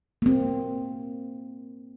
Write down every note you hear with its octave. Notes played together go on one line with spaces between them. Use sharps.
A#3 C4